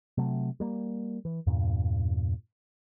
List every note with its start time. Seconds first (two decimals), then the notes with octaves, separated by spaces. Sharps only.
0.18 C3 F#3 A3
0.60 G3 A#3
1.25 E3
1.47 E2 G2 A#2